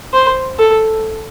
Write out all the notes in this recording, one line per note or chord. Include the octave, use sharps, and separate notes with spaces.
C5
A4